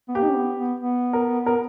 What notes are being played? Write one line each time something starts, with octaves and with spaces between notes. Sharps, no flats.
B3
A#3 G4
D#4
C#4
B3
B3
B3
A#4
A#4